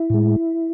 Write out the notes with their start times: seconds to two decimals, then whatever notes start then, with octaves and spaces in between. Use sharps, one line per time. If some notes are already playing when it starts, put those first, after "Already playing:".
Already playing: E4
0.10 A2 G#3